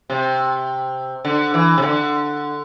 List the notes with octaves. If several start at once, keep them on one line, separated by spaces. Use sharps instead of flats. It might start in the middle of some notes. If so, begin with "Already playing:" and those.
C3
D3
E3
C3
D3